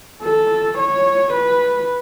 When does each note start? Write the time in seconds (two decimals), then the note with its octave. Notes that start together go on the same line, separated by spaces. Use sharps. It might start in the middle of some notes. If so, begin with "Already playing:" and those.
0.23 A4
0.78 C#5
1.33 B4